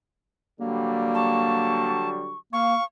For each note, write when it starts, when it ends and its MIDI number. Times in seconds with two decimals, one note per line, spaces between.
0.60 2.34 50
0.60 2.34 54
0.60 2.34 55
0.60 2.07 58
1.15 2.09 81
1.15 2.38 85
2.53 2.75 58
2.53 2.83 77
2.53 2.84 85